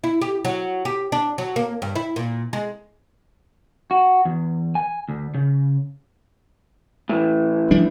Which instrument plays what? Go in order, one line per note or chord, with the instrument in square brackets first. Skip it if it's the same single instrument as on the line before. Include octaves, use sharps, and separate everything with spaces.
[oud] E4
G4
F#3
G4
D4
F#3
A#3
G2
E4
A#2
G#3
[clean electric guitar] F#4
E2
G#5
D2
C#3
A2 E3
[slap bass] F3 G3 D4